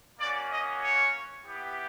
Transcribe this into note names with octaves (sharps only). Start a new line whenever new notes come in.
A#3 C#4 F#4 D5
D#5
C#5
B3 E4 G4